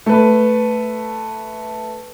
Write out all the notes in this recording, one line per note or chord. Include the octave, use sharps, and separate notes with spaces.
A3 B4